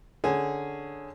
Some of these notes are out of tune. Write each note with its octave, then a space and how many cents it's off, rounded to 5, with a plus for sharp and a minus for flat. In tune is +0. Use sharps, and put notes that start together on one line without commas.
D3 +0 C#4 +0 G#4 +0